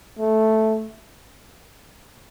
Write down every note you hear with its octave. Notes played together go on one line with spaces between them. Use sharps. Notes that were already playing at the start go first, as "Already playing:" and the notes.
A3